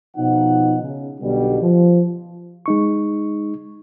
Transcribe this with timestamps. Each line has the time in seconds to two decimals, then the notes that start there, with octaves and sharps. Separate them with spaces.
0.17 B2 F3 D#4 F#5
0.83 C#3
1.21 B1 B2 D3 G3
1.62 F3
2.66 G#3 D#4 C#6